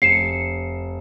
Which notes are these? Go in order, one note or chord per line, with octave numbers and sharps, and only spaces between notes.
F1 C7 C#7 E7